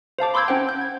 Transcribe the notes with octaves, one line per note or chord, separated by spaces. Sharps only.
C5 F5 A5 D6
B5 C6 D6 E6 G6 G#6
C#4 C5 F#5 G5
G6
G#6